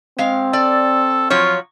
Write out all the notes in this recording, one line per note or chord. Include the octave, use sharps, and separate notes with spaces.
G#3 C4 F5
A4 D5
F3 F#3 F4 C#5